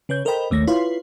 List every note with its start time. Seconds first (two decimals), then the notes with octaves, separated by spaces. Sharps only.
0.09 C#3 B4 C#5 G6
0.25 A4 A#4 C5 D#5 G5 B5
0.51 A1 D#2 A3 C#5 A#6
0.67 E4 F4 B4 C#5 F5 C6